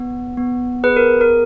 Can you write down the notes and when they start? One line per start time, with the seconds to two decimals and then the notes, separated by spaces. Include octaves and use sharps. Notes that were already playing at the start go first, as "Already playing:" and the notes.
Already playing: B3
0.37 B3
0.84 G#4 B4
0.97 A#4
1.21 A#4